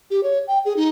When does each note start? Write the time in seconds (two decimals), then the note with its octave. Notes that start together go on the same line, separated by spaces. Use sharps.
0.11 G4
0.23 C#5
0.48 G5
0.65 G#4
0.77 D#4